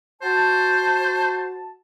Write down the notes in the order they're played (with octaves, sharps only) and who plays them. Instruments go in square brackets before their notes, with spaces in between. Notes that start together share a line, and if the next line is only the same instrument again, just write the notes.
[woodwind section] F#4 A5 [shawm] C5